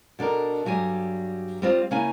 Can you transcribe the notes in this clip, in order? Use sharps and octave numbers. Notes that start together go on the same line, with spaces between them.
B2 D4 A4 A#4
G2 F#3 G3 G#5
G3 C4 F4
C#3 A#3 C#4 E4 G#5 A#5